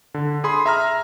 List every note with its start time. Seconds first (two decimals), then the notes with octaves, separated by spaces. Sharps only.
0.14 D3
0.44 G#4 B5 C6
0.66 E5 A#5 F6